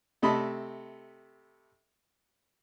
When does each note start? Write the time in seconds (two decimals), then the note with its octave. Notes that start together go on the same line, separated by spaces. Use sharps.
0.22 C3 A3 D#5 A5 B5